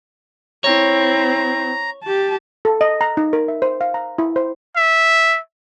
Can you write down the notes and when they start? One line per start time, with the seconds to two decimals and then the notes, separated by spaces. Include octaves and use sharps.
0.64 C4 E4 C#5 A#5
2.04 G4 A5
2.65 A4
2.81 D#5
3.01 A#5
3.17 D#4
3.33 A#4
3.48 E5
3.62 C5
3.81 F5
3.94 A#5
4.18 E4
4.36 C5
4.76 E5